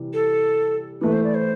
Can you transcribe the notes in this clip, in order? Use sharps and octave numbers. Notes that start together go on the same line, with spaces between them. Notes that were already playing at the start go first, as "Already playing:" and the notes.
Already playing: C3 E3 G3
A4
E3 A3 E4 B4
C5
D5
C5